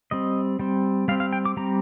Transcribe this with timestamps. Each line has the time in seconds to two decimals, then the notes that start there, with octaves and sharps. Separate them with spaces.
0.11 G3 C4 D#5
0.59 G3 C4
1.08 G3 C4 F5
1.20 F5
1.33 G5
1.45 D6
1.57 G3 C4 A#5